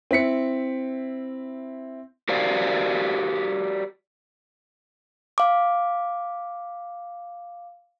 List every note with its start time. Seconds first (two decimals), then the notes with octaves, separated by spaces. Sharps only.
0.11 C4 E4 B6 C#7
2.29 F#4 G4 A#4 C5 D5 F5
5.38 F5 D6